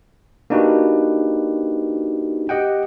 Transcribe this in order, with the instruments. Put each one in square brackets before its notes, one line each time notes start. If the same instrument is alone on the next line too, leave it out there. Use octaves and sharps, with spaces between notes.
[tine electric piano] A#3 D4 D#4 F#4 G4 B4
G4 D#5 F#5 G5